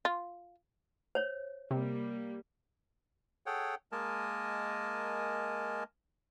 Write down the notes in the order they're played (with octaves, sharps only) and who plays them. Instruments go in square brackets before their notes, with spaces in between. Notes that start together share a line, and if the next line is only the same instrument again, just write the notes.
[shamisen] F4
[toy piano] C5 C#5
[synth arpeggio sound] C3 [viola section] G3 A#3
[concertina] G#4 A4 C#5 F#5 G5
G#3 A#3 A#4 D#5 G#5 A5